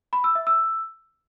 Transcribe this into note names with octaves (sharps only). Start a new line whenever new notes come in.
B5
E6
E5
E6